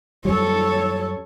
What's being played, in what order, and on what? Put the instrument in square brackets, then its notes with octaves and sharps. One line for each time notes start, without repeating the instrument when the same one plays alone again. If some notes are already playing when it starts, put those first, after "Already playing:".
[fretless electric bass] F#2 G3 [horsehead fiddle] A4 C#5